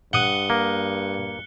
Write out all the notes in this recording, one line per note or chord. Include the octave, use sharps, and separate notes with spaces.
G2 F#5 D#6 F#6 C#7 G7
A#3